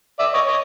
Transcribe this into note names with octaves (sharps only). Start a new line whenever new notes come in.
D5 E5
C#5 D#5
C#5 D#5